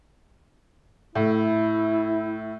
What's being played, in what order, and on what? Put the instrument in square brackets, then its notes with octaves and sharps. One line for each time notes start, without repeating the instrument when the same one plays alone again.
[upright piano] A2 [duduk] E4